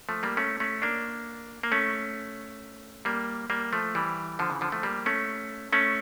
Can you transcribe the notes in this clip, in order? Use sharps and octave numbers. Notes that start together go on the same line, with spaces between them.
F3 A3
G3 A#3
A3 C#4
A3 C#4
A#3 D4
A#3
A3 C#4
G3 A#3
G3 A#3
F3 A3
E3 G3
D3 F3
C#3 E3
D3 F3
F3 A3
G3 A#3
A3 C#4
A3 C#4